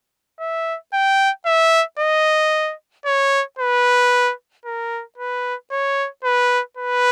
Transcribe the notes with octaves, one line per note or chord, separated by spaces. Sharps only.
E5
G5
E5
D#5
C#5
B4
A#4
B4
C#5
B4
B4